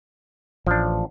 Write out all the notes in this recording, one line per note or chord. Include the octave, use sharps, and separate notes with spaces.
A1 F3 D4